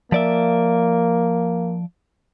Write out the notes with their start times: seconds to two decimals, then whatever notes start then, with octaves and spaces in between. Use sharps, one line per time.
0.12 F3 A#3 D5 E5